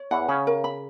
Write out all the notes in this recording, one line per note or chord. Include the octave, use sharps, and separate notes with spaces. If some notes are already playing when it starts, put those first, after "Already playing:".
Already playing: C#5
E2 E3 F#5
C#3 C#4 B5
A#4
B5